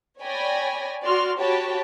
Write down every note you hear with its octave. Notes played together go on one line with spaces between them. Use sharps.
C#5 D5 G5 G#5 B5 A#6
F#4 D5 C6 F6
F#4 G4 C#5 G5 A5 B5